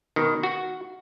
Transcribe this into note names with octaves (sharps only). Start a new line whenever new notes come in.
B2 D#3
F#4